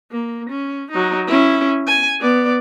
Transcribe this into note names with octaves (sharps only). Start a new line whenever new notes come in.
A#3
C#4
F#3 D#4
C#4 E4
G#5
B3 D5